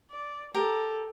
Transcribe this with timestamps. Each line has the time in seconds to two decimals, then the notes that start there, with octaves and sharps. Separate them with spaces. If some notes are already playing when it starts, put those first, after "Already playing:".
0.11 D5
0.54 G4 A4 A#4 A#5